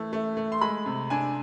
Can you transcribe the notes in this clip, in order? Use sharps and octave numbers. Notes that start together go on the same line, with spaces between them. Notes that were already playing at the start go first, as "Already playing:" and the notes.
Already playing: E3 A3
A3
A3
C6
G#3 B5
C3
D4 G#5